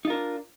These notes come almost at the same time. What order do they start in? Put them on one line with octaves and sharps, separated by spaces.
D#4 F4 A#4 D4